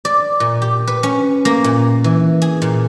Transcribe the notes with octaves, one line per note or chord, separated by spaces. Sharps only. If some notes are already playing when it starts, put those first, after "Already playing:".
D5
A#2
G4
B4
C#4
A#3
A#2
E3
G#4
A#2